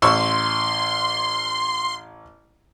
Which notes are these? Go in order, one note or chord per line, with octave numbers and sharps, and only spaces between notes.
A1 C6 C#6 E6